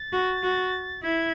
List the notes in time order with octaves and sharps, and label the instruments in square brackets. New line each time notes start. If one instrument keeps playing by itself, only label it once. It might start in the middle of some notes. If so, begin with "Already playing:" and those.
Already playing: [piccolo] A6
[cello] F#4
F#4
[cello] E4 [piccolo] G#6